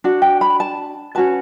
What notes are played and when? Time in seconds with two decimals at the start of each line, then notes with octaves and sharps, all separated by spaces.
0.04 D4 F#4
0.22 G5
0.41 B5
0.60 A5
1.15 C#4 F#4 B4 A5